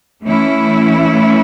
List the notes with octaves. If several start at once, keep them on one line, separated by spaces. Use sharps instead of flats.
E3 A3 C#4 E4